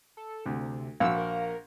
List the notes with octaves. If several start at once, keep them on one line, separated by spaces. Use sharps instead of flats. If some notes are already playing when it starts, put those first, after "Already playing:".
A4
D2 C3
A#1 F#4 F5 E6
A#4